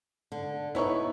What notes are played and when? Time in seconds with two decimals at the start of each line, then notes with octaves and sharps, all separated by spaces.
0.32 D3
0.75 B3 D#4 E4 C#5 C#6